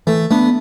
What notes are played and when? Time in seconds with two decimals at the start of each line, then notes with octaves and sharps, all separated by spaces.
0.07 E3 A3
0.30 A3 B3 D4